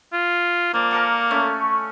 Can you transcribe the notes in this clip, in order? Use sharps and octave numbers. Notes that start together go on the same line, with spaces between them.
F4
F3 A#3 D5
A#4 F#5 A5
A3 C#4 G#5